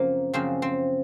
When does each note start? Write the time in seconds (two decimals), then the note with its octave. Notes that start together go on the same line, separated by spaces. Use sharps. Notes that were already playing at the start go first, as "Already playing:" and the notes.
Already playing: F#2 C#3 F3 A#3 C4
0.34 F#2 C#3 F3 C4
0.62 C4